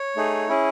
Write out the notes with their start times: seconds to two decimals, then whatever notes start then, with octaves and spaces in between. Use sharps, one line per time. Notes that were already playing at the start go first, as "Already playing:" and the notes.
Already playing: C#5
0.16 A3 D#4 G#4
0.49 C#4 E4 G#4